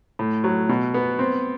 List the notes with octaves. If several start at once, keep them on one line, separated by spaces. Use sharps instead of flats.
A2
F#3
B2
B3
C4